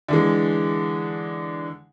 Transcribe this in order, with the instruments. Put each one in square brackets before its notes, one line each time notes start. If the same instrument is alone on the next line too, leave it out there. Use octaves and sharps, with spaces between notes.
[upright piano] D3 E3 G#3